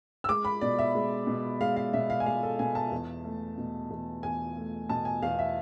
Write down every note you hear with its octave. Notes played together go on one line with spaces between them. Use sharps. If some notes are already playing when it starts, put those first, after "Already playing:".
E6
G#3 D6
B5
B2 D5
E5
G#3
B2
G#3 F5
F5
B2 E5
F5
G#5
G#3 F5
A4
B2 G#5
A5
E2
A3
B2
E2
E2 G#5
A3
B2 A5
G#5
E2 F5
E5